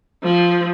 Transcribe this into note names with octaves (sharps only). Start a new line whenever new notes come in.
F3